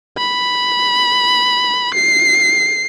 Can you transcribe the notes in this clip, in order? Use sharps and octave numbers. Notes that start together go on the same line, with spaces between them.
B5
C7